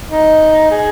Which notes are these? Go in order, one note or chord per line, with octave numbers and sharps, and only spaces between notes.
D#4
G#4